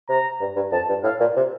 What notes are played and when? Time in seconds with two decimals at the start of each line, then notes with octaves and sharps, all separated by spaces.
0.09 C3 A#5
0.40 G2
0.56 G2
0.72 F2 A5
0.89 G2
1.03 A2 F5
1.20 A#2
1.36 C3